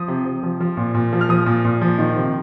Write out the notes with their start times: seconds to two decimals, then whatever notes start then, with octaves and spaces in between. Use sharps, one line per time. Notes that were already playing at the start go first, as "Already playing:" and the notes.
Already playing: F3 D#6
0.08 C3
0.25 C3
0.43 F3
0.60 F3
0.77 A#2
0.94 A#2
1.13 F3
1.21 F6
1.29 F3 D#6
1.46 A#2
1.65 A#2
1.81 F3
1.98 D#3
2.16 C3